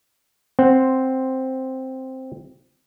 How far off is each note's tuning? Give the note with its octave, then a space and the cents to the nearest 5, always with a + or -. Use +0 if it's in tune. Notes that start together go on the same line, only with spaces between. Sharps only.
C4 +0 C5 +0 F#5 +5